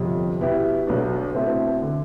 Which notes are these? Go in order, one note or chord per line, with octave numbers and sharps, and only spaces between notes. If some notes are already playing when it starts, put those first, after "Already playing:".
Already playing: G1 F2 C3
B2 B3 E4 G4
B1 B2 B3 D4
B2 A3 C4 E4
D3